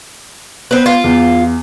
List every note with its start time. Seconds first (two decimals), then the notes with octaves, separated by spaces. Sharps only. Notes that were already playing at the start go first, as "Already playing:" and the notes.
0.71 B3 C4 B4
0.86 F4
1.04 E2